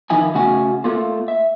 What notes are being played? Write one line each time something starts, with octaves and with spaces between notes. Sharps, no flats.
D#3 F3 D#4 E4 G#5
C#3 A3 C#4 F#4 F#5 G#5
A3 A#3 F4
E5